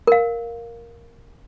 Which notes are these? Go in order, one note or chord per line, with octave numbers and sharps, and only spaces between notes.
A#4 F5